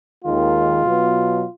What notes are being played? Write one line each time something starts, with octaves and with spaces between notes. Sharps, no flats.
D#2 D#3 G#3 F4
B2 F#3 B3